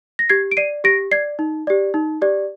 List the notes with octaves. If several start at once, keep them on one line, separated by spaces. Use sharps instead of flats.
A#6
G4 G#6 C7
D7
D5 C7 D#7
G4 A#6 D7
D5 G#6 C7
D#4
G4 D5
D#4
G4 D5